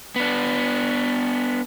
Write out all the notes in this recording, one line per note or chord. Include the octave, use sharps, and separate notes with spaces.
B3 D4